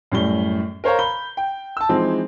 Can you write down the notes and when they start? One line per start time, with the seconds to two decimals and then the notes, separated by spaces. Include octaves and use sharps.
0.12 F#2 A2 G3 G7
0.84 A#4 C5 C#5 F5 A#5
0.99 B5 G6 G7
1.37 G5
1.77 A5 E6
1.89 E3 F3 G#3 C4 D#4